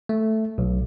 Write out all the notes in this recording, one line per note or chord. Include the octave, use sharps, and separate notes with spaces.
A3
B1